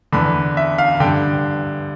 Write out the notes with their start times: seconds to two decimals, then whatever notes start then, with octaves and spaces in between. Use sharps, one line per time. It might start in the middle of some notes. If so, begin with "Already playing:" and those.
0.13 E2 D3 B5
0.57 E5
0.78 F5
1.00 G2 D3 G5